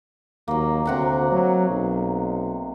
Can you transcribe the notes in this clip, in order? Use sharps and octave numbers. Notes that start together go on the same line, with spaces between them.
D#2 F#3 A#3
D2 C3 F#5 A#5
F#3
B1